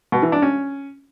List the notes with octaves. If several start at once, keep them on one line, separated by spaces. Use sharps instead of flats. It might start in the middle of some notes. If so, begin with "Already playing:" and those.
B2
E3
D4
C#4